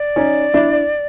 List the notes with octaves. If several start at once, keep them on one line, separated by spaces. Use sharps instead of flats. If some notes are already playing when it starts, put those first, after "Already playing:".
Already playing: D5
C#4 D#4
D4 E4